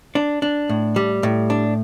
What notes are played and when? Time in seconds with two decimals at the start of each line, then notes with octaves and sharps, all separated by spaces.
0.15 D4
0.42 D4
0.69 A2
0.96 G3
1.23 A2
1.50 D4